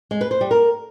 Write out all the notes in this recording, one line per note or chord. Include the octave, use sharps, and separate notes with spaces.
G#3
B4
C5
G3
A#4